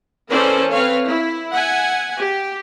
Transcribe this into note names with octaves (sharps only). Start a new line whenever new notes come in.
E3 C#4 A4 A#4 C5 D5
C4 B4 C#5 F5
E4
E5 F#5 G#5
G4